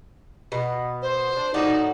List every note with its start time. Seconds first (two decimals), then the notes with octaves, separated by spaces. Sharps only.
0.52 B2 B3
1.02 C5
1.36 D4
1.54 A2 D#4 F#4 D5